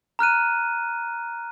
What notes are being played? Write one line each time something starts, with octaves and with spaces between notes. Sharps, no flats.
A#5 F6 F#6 D#7